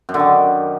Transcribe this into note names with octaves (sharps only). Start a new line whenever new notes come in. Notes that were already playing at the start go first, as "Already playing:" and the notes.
F#2
D3
D#3